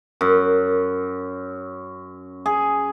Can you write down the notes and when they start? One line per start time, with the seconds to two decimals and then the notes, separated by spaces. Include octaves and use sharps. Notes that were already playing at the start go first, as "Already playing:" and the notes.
0.21 F#2
2.46 G#4